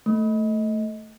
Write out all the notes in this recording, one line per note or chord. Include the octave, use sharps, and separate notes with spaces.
A3